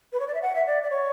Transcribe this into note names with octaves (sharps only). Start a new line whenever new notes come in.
B4
C#5
D5
E5
F#5
E5
D5
D5
C#5